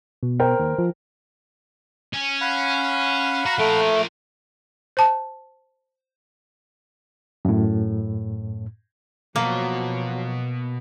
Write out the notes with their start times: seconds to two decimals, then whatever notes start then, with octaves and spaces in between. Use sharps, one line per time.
0.23 B2
0.40 A#4 C5 G5
0.59 D#2
0.78 F3
2.13 C#4
2.41 F5 F#5 B5
3.46 F#4 A#5
3.58 F3 A3 A#4
4.97 C5 A5
7.45 F#2 A2
9.36 B2 F3 F#3 A#3